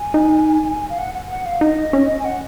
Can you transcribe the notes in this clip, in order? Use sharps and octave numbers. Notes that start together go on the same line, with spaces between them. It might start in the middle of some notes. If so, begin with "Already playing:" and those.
Already playing: G#5
D#4
F5
F#5
F#5
F#5
F5
D#4 D#5
C#4
G#5
F#5